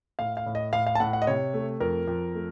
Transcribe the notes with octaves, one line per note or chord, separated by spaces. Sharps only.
A2 F5
F5
A2
D#5
A2 F5
F5
A5
A2 F#5
F#5
D#5
C3 C#5
A3
F2 A#4
F2
A3